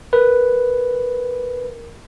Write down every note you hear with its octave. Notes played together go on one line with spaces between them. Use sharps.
A#4 B4